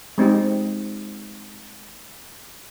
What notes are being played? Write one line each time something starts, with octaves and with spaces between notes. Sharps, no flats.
G#3 C4 D#4 G4